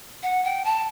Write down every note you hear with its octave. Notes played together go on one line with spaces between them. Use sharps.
F#5
G5
A5